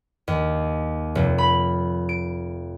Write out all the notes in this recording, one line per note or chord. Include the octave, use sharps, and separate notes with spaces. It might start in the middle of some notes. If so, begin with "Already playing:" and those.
D#2
F1
B5
D7